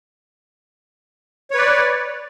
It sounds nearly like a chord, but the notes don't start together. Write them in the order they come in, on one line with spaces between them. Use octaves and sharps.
C#5 B4 D5